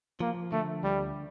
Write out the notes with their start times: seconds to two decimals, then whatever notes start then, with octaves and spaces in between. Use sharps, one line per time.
0.20 F3 A#3
0.52 D3 A3
0.83 D2 G3